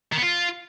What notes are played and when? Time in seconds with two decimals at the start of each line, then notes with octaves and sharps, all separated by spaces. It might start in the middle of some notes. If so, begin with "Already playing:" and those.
0.12 D#3
0.17 B3
0.22 F4